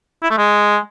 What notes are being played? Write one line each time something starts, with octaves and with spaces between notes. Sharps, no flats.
E4
A3
G#3